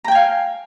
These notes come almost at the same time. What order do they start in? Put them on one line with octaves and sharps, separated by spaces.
A#5 G5 G#5 F5